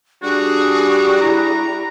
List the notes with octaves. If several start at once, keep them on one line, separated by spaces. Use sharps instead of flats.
G3 D4 F#4 G#4
E4 A#5